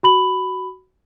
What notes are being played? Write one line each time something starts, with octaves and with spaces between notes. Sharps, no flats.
F#4 B5 F#7